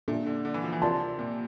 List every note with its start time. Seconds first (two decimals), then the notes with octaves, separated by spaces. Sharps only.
0.08 A#2 D4 A4 E5
0.26 D3
0.45 D3
0.54 E3
0.63 F3
0.72 E3
0.82 C3 F4 A#4 D5 A5 C6
1.19 A#2